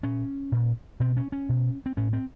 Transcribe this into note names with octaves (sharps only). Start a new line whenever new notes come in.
A#2 C#4
A#2
B2 C4
C#4
C#4
B2
C4
A2 C#4
C4